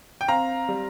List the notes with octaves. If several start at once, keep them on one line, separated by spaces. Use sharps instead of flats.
G5
C4 F5 A#5
G3